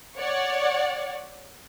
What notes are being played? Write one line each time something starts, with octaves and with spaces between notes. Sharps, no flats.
C#5 D5 F#5